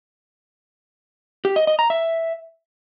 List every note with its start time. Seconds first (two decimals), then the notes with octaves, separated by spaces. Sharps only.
1.45 G4
1.56 D#5
1.67 D#5
1.79 A#5
1.90 E5